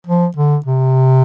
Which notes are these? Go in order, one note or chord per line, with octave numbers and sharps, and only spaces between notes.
F3
D3
C3